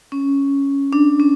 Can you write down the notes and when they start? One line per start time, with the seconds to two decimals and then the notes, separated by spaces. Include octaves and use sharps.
0.12 C#4
0.93 D4
1.20 C#4